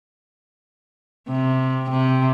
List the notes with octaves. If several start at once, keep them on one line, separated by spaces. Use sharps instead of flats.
C3
C3